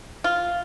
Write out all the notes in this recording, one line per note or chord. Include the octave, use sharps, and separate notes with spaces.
F4